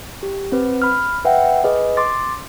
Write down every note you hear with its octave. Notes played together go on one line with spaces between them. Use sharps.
G4
C4 B4
B5 F6
B4 E5 F#5 G5
G#4 B4 D#5
C6 D6 A6